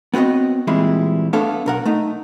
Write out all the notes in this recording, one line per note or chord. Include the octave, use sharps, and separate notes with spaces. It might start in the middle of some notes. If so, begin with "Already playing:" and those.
B3 C4 F#4 C#5 D#5
A#2 E3 G3 G#3 C4 E4
A3 B3 D4 A4 C#5 F5
B1 A#4 F#5
A3 D#4